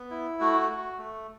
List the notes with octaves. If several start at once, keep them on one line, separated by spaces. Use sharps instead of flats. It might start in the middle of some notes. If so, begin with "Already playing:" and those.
Already playing: B3
E4
A3 F#4
F#4
A3